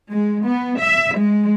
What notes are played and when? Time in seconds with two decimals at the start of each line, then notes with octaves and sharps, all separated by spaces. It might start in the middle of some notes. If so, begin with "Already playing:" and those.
0.11 G#3
0.44 B3
0.79 E5
1.18 G#3